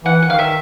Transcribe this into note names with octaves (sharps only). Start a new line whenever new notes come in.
E3 F#5
D#3 F#5
F5
E5